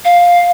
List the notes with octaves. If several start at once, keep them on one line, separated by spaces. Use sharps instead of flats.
F5